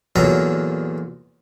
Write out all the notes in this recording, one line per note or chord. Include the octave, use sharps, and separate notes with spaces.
E2 A#2 D3 F#3 A#5